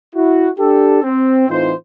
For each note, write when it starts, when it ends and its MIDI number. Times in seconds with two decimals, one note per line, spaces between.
0.15 0.49 64
0.15 0.49 66
0.59 1.03 62
0.59 1.03 67
0.59 1.03 69
1.03 1.49 60
1.49 1.72 45
1.49 1.72 52
1.49 1.72 60
1.49 1.72 63
1.49 1.72 65
1.49 1.72 72